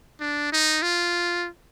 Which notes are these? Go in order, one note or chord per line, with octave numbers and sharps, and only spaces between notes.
D4
D#4
F4